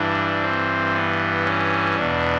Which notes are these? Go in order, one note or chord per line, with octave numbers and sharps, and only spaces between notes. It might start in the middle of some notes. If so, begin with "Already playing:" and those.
Already playing: G2 E3 D4
C4
B3
C#4
E2 B2 D4